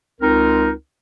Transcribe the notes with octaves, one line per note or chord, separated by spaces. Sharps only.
C#2 C4 D#4 A#4